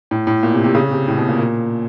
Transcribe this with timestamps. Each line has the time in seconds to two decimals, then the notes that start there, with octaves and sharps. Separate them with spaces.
0.11 A2
0.27 A2
0.43 A#2
0.53 C3
0.64 C3
0.75 C#3
0.91 C3
1.08 A2
1.18 B2
1.29 A#2
1.39 A#2